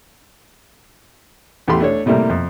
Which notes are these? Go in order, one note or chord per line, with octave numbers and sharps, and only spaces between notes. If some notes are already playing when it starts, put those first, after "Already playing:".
A1 E2 A3 G4 B5 C6
A3 D4 C#5
A2 C3 G3 A3 A#3
F2